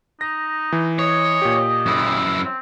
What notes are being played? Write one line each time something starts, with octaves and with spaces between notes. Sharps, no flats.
D#4 A#6
E3
C#5 D#5
A#2 G4
F#2 E4
C4